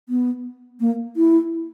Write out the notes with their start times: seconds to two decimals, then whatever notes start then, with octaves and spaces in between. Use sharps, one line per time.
0.09 B3
0.80 A#3
1.16 E4